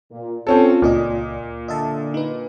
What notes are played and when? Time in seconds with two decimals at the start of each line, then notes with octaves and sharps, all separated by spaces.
0.11 A#2
0.47 C4 C#4 F4 A4
0.82 C#2 A#2 D5 D#5
1.68 D3 D#5 E5 A5
2.14 D#4 B4